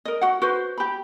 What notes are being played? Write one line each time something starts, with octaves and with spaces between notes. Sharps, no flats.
A#4 D#5
F#4 F#5
F#4 B4 C5
G4 B5